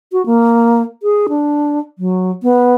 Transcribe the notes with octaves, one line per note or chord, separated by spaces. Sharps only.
F#4
A#3
G#4
D4
F#3
B3